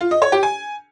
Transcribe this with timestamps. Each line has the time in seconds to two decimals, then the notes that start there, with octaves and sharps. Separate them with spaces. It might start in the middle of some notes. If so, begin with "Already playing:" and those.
0.01 F4
0.11 D#5
0.22 C#5
0.32 G4
0.43 G#5